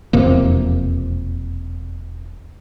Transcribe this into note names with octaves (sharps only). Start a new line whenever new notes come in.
E1 F2 C3 A#3